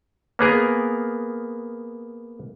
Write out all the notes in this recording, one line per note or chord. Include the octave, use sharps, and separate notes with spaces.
A#3 B3 G#4 A#4